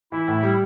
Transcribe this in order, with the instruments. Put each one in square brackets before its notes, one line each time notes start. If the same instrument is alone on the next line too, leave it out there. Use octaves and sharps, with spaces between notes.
[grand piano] E3 [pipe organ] E4
[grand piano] A2
G3